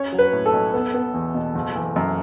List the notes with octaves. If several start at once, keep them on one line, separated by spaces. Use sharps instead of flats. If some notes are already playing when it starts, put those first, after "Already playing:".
Already playing: C#4 C#5
F#3
B4
A2
A4
B1
B3
B3
E2
B2
F#1
E3
F#2